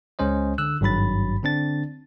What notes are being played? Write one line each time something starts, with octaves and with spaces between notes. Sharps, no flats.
C#2 G#3 C#4 C5 D#5
D3 E6 F#6
G#1 G2 F#3 B5 A6
D3 C4 D4 A6